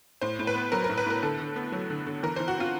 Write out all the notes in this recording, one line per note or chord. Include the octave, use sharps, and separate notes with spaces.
A2 C5
A2
B4
B3
F#3 A#4
A#4
A2
B4
A2 A#4
D3 A4
D3
B3
F#3
D3
D3
E3 A#4
E3 C5
F#4
C4 F4